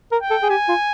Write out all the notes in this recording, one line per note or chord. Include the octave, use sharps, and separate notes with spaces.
A#4
G5
A4
G#4
G4 G#5
F4